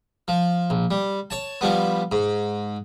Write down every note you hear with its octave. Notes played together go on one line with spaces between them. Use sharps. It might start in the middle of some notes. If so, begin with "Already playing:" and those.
F3
A#1
G3
C#5 A5
F3 G3 B3
G#2